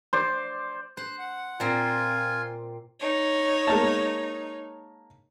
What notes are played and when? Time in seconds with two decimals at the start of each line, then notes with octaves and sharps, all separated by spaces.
0.13 C5 D5
0.97 C5 F#6
1.19 F#5
1.60 A#2 C4 F4 G#5
2.99 D#4 C#5
3.67 G#3 A#3 A5